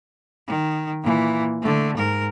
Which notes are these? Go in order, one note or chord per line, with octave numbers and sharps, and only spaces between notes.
D#3
A#2 E3
D3 A3
G#2 A#4